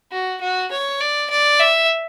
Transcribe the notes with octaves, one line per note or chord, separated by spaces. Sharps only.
F#4
F#4
C#5
D5
D5
E5